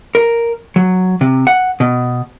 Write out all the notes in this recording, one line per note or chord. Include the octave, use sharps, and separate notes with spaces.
A#4
F#3
C3
F#5
B2